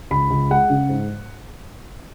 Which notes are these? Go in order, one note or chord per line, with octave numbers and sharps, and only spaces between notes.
C#2 B5
C#2
G#3 F#5
C#3
G#2